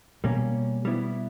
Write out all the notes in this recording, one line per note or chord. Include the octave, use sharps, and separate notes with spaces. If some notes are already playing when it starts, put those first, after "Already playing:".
B2 G3 A#3 C#4
G3 B3 E4